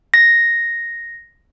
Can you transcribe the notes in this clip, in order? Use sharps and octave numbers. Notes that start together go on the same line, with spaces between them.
A#6